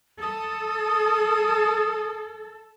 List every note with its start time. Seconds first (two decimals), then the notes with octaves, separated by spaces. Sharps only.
0.22 A4 D#6